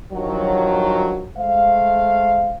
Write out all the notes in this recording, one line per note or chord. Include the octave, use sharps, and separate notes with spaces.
G2 D#3 F3 F#3
G#3 A3 C5 F5